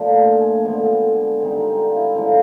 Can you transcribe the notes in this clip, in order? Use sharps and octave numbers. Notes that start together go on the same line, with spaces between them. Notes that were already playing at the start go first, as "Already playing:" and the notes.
Already playing: A#2 F3 A3 D4
A5
G#5
D3 F3 G#3 B3 D5
D3 G3 C4 D#4 D5
A#4
F4
E4
D3 F3 G#3 C#4 F4